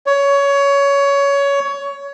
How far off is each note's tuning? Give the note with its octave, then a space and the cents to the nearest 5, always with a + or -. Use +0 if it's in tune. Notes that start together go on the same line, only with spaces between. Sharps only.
C#5 +20